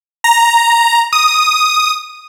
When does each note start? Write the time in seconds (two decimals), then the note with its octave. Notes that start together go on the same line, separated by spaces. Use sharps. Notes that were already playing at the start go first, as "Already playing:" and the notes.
0.24 A#5
1.13 D#6